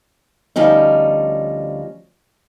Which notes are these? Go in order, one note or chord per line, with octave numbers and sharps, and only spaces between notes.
D2 F3 G3 C#4 D#4